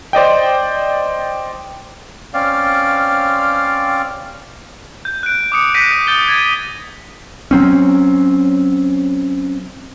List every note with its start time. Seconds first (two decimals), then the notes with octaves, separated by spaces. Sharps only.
0.13 C5 D5 D#5 G5
2.34 C4 C#4 D5 F5
5.05 G6
5.23 F#6 D7
5.52 D6 D#6 C#7
5.74 F#6 G6 A#6 B6 C#7 D#7
6.07 D#6 G6 A6 G7
6.28 G#6 A6 D#7
7.51 F#3 C4 C#4